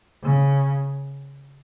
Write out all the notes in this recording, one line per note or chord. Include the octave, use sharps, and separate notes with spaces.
C#3